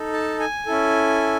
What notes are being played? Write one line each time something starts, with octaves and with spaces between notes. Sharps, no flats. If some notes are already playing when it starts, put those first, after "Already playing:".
Already playing: D#4 A4
A5
G#5
C#4 E4 A4